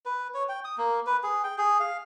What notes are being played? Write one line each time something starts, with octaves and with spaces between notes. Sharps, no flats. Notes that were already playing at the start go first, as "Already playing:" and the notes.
B4
C#5
G5
D#6
A#3
B4
G#4
G5
G#4
F5